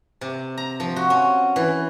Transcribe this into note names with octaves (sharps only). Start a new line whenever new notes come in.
C3
A#5
F3
F#4
C#4
E3